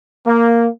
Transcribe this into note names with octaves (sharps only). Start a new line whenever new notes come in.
A#3